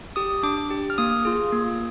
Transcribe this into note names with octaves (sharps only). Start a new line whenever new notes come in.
G4 D#6
D4 D6
G4
F6
A#3 D#6
F4 G#4
A#3